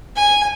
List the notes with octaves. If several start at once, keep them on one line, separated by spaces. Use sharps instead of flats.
G#5